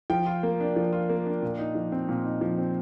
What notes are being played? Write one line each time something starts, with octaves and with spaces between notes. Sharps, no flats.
F3 G5
F4
A#3
D4
F3
F4
A#3
D4
A#2
D#4
F3
C4
A#2
D#4
F3
C4